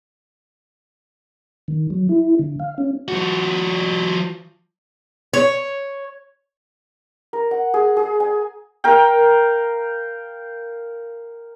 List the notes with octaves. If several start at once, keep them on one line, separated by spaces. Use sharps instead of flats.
D#3
F#3
E4
D3
F5
C#4
F3 F#4
C#5
A#4
F#5
G#4
G#4
G#5
A#4 F5 G5